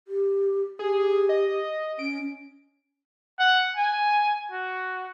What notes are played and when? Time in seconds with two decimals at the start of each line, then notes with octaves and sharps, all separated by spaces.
0.08 G4
0.79 G4 G#4
1.29 D#5
1.99 C#4 D7
3.39 F#5
3.76 G#5
4.52 F#4